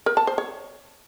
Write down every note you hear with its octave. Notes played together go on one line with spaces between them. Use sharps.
A#4
A5
C5
C#5